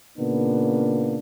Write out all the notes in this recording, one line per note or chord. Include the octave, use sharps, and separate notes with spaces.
A#2 C#3 A#3 B3 D4